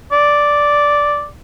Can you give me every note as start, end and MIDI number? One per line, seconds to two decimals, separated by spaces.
0.12 1.27 74